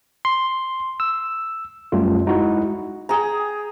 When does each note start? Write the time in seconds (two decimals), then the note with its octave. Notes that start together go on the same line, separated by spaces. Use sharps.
0.25 C6
1.00 E6
1.92 F#2 G3 A3 F4
2.26 G#3 D#4 E4 F#4
3.09 G#4 G5 A#5